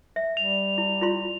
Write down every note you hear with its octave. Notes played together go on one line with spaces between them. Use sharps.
E5
G3 F7
E4
E4 F4 C6